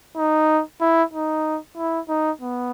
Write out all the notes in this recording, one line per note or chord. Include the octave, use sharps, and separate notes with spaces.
D#4
E4
D#4
E4
D#4
B3